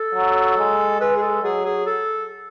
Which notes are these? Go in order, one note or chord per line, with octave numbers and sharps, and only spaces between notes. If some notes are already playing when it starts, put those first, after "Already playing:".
Already playing: A4
F#3
G#3
G#3 B4
G#4
A4
F#3 G#4
G#4
A4